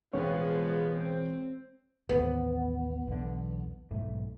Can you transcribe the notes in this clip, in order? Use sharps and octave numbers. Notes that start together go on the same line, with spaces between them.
E1 A1 F3 G#3 B3 C#5 G5
C4
A1 D#2 B3
B1 E2 D3
B1 G#2 A3